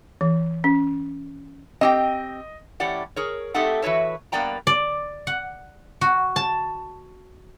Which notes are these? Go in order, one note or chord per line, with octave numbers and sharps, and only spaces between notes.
E3
C#4
C4 G4 D#5 G5
A2 E3 C#4 G4 D5 F#5
G#4 A#4 C#5
A3 C4 D#4 G4 A4 F#5
E3 F#4 B4 C#5 E5
G2 A#3 B3 D5 G5 A#5
D5
F#5
F#4
A5